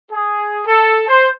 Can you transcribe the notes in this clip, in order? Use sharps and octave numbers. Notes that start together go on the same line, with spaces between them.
G#4
A4
C5